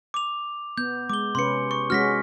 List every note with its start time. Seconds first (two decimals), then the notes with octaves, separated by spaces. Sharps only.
0.14 D6 F7
0.78 B3 G6
1.10 G#3 D6 G7
1.35 C3 C#4 B4 C6 C#7
1.71 C#6
1.90 G#3 C#4 F#4 F6 A#6 B6